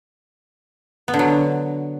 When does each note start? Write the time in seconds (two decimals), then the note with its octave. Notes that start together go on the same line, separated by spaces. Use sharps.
1.08 B3
1.14 D3
1.19 F#3